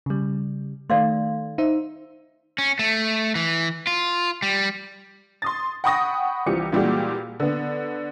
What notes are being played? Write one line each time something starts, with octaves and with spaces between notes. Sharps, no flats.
C#3 G3
D#3 A3 D5 F5 C6
D#4 C5 E5
C#4
A3
E3
F4
G3
C6 D#6 A6
F#5 G5 B5 C#6 D#6 A#6
C2 E3 F3 G4 C#7
A#2 E3 G3 G#3 F#4 G4
D3 B3